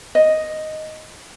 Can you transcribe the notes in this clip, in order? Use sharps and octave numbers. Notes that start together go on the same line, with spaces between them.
D#5